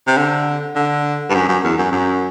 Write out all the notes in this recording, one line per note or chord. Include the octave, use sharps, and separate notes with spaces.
C3
D3
D3
G2
F#2
F#2
E2
F#2
F#2